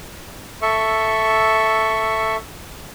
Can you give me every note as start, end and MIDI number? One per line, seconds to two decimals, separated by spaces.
0.62 2.36 69
0.62 2.36 76
0.62 2.36 85